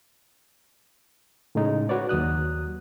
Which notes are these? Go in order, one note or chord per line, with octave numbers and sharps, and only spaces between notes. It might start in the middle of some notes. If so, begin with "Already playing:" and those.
A2 C#3 G#3 D#4
F#4 B4 C#5 D5
D#2 F#3 D#6 F#6